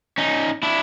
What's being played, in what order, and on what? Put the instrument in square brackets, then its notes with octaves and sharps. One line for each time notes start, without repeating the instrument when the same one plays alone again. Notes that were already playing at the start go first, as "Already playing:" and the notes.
[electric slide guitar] C#4 D#4
D4 E4